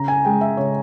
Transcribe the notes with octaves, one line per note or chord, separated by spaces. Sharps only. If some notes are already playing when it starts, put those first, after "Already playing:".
Already playing: C#3 A#5
G#5
G#3 G5
E5
C#3 C#5